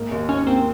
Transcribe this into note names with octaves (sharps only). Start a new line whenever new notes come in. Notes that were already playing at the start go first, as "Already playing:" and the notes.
Already playing: G#2 A#3
D#2
C#4 D#4
A#3 C4